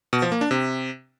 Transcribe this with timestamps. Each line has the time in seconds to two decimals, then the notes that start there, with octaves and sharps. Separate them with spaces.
0.13 B2
0.22 F3
0.32 A#3
0.41 D4
0.51 C3